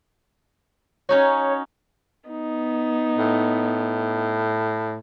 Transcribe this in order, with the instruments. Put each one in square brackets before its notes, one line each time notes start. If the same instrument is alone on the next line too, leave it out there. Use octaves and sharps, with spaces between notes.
[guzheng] C#4 D#4 F#4 [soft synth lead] C#5
[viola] B3 D#4
[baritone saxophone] A2